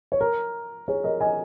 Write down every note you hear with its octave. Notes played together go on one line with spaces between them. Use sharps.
C#5
A#4
G#4 C#5
A#4 D#5
D#5 G#5